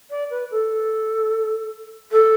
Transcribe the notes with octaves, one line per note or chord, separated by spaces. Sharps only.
D5
B4
A4
A4